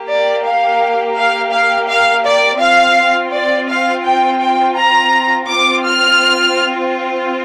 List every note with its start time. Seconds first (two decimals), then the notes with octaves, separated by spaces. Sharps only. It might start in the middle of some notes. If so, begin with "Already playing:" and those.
Already playing: A#3 G4
0.08 D5
0.44 F5
1.16 F5
1.52 F5
1.88 F5
2.24 D5
2.60 C4 F4 F5
3.32 D5
3.68 F5
4.05 G5
4.41 G5
4.76 A#5
5.48 C4 F4 D6
5.84 F6